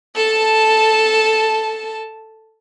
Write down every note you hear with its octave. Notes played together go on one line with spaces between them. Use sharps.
A4 A5